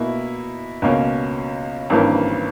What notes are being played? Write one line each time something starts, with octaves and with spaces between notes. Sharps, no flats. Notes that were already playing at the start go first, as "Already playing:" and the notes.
Already playing: B2 A#3 E4
C#2 B2 A#3 C#4
G#1 G2 E3 A#3 C#4